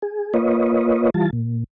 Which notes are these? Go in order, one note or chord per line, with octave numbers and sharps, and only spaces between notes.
G#4
A#3 F4 B4 C#5 D#5
E3 G3 F4 A5
A#2